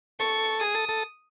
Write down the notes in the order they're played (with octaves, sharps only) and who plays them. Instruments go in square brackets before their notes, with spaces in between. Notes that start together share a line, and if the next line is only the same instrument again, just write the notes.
[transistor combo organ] A4 [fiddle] C#6
[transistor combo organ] G#4 [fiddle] D#6
[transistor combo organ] A4
A4